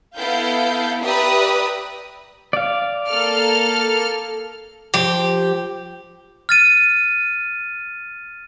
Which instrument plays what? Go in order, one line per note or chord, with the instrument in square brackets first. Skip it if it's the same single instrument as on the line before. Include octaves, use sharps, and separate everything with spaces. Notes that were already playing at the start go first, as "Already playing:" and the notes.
[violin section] B3 E4 A4 F5 G6
G4 B4 D5 E5 A#5 D#6
[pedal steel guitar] D5 F5
[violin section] A#3 A4 F6
[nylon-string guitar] F3 [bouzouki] G4
[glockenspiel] F6 A6 D#7